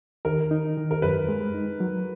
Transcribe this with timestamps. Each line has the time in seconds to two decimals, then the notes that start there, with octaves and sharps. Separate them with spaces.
0.25 D#3 A#4
0.51 D#4
0.77 D#3
0.91 A#4
1.02 F#2 B4
1.29 G#3
1.54 D#4
1.80 F#3